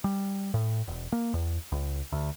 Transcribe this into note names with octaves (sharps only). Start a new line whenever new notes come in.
G3
A2
E1
A#3
E2
C#2
D2